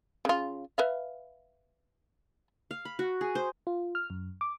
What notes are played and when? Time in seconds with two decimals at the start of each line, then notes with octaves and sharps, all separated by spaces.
0.25 C#3 F4
0.78 B4 E5 F5
2.71 F5
2.85 B5
2.99 F#4
3.21 G#4
3.35 C5
3.67 F4
3.95 F6
4.10 F#2
4.41 D6